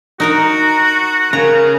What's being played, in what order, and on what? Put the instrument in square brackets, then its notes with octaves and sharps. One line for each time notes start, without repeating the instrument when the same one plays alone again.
[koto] D#4 A#4 A#5 [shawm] F#4
[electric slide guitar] C#3 [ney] A#4 [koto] A#5